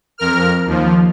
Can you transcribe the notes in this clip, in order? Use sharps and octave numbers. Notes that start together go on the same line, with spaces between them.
F2 A#4 F6
D#2 F3